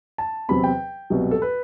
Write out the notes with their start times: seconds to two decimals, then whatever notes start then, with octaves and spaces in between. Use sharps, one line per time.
0.18 A5
0.49 E2 C3 F#3 C4 B5
0.64 G5
1.10 C2 B2 F#3
1.31 A4
1.42 B4